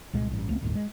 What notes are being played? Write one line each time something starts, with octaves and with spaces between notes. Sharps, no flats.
C2 A#2 G#3
A1 G2
C#2 A3 B3 C4
G1 D#2 A2 D#3
G#3